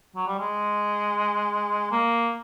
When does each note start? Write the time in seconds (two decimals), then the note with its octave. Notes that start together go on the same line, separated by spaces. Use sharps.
0.16 F#3
0.27 G3
0.39 G#3
1.91 A#3